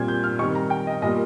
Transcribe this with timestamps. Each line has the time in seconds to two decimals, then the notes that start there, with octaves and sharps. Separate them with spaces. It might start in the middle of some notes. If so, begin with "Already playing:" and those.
Already playing: A#2 G3 C4 G#6
0.08 G6
0.24 F6
0.39 D#3 G3 C4 C#6
0.55 A#5
0.70 G5
0.87 D#5
1.02 A#2 G3 A#3 D#5